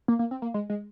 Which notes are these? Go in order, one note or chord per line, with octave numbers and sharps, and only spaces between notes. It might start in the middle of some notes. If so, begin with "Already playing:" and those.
A#3
A#3
C4
A#3
G#3
G#3